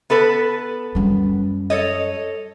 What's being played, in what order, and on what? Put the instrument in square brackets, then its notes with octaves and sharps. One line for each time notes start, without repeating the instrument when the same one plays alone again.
[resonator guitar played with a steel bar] B3 A4 B4
[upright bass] F#2 G3
[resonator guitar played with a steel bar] A4 C#5 D#5